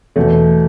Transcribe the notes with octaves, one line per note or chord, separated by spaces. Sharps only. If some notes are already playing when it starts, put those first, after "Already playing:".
E2 B2 A3